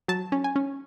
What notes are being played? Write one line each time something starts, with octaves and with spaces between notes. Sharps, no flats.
F#3 A5
C#4
G#5
C#4